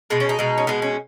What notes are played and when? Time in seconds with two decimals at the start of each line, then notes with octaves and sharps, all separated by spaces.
0.10 B2 G#3 B3
0.20 C#4
0.29 D#4
0.39 B2 G#3
0.58 C#4
0.67 B2 G#3 B3
0.82 C#4